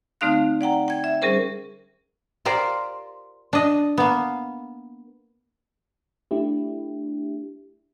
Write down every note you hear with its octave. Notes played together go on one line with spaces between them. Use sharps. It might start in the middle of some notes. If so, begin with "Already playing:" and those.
D3 A3 C4 D#4 F5 F#6
D5 F#5 G5 A#5
G5 G#6
E5
G3 C#4 G#4 A#4 C5
F4 G4 A#4 C5 D5
D4 D#5
A#3 B3
A3 D4 E4 G4